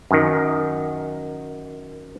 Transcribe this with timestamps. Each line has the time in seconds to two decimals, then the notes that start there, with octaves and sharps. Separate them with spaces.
0.11 F#2 D#3